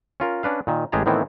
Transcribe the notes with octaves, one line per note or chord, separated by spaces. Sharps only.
C#4 F4 A#4
C#4 D4 B4 F5
A#2 D#3
A1 G#3 G4 G#4 A5 A#5
A2 D#3 E3 B3 C4 E4